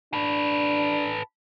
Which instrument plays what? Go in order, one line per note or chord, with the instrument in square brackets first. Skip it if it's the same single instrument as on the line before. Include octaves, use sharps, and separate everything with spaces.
[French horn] D4 [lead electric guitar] A4 B4